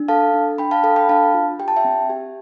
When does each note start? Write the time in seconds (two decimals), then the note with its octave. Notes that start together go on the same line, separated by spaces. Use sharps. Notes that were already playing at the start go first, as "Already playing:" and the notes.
Already playing: D4
0.08 A4 F5 A5
0.34 D4
0.58 D4 G5 B5
0.71 F5 A5
0.83 A4 F5 A5
0.96 G5 B5
1.09 D4 F5 A5
1.34 F4
1.59 G4 G5
1.68 A5
1.76 E5 G5
1.85 C4
2.10 G4